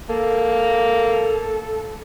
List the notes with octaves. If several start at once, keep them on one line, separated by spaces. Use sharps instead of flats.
A#3 A4